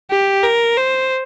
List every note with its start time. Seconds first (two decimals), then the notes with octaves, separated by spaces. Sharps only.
0.10 G4
0.43 A#4
0.77 C5